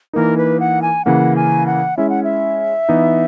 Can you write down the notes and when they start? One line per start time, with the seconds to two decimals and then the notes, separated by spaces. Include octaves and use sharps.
0.13 E3 A#3 D#4 A#4
0.37 B4
0.60 F#5
0.82 G#5
1.05 C#3 E3 A#3 C#4 F#5
1.36 G#5
1.66 F#5
1.97 G#3 C#4 E4 E5
2.10 F#5
2.24 E5
2.89 E3 B3 D#4